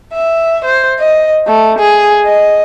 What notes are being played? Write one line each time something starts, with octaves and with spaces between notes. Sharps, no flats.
E5
C5
D#5
A3
G#4
D#5